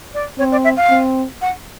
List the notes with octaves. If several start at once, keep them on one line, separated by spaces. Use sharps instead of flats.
D5
C4 C#5
D5
E5
F5
C4
F#5